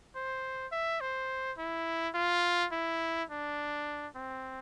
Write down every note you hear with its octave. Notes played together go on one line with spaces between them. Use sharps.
C5
E5
C5
E4
F4
E4
D4
C4